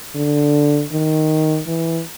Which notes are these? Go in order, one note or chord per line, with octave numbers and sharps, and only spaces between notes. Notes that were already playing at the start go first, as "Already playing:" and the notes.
D3
D#3
E3